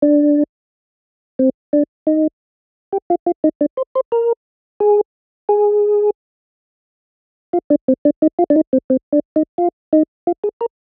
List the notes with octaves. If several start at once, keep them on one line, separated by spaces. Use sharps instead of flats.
D4
C4
D4
D#4
G4
F4
F4
D#4
D4
C5
C5
A#4
G#4
G#4
F4
D4
C4
D4
D#4
F4
D4
D#4
C4
C4
D4
D#4
F4
D#4
F4
G#4
A#4